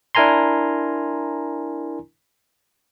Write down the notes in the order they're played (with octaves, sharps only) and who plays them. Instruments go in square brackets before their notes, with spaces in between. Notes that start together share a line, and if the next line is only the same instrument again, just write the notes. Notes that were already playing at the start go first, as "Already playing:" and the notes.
[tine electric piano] D4 E4 A#4 G#5 A#5 C6